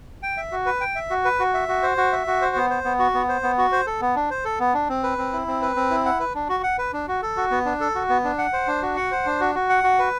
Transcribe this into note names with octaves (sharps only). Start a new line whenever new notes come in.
G5
E5
F#4
B4
G5
E5
F#4
B4
F#4
E5
F#4
C5
F#4
E5
F#4
C5
B3
C5
B3
F#4
B3
C5
B3
F#4
C5
A4
B3
D4
C5
A4
B3
D4
C4
B4
C4
E4
C4
B4
C4
E4
F#5
B4
D4
F#4
F#5
B4
D4
F#4
A4
F#4
B3
D4
A4
F#4
B3
D4
F#5
C5
D4
F#4
F#5
C5
D4
F#4
F#4
F#5
F#4
B4